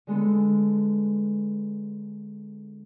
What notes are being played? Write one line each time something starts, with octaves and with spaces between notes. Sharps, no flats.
D3 G#3 B3 A4